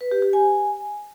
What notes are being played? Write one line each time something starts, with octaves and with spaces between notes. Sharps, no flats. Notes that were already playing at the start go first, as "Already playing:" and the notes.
B4
G4
G4
G#5